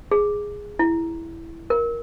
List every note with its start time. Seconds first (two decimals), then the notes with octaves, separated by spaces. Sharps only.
0.11 G#4
0.79 E4
1.70 A#4